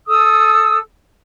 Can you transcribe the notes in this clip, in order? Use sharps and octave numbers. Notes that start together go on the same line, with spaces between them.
A4 D#6 E6